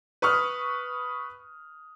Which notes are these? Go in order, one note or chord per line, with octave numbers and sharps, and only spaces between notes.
B4 C#6 D#6 F6